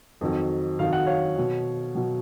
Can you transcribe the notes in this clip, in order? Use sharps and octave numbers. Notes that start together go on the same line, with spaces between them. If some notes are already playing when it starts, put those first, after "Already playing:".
F2 D#3 F#3
F2 D#3 F#3 F5
F#5
C#5 F5
B2 F#3
B2 F#3